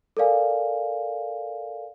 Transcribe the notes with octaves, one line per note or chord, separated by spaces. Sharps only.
A4 A#4 D5 F5 G#5